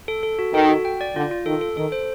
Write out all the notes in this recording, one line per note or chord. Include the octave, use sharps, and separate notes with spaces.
A4
A4
F#4
D#3 A4
F#4
G5
D5
D3 F4
F4
D#3 A4
A4
D#3 A4
C5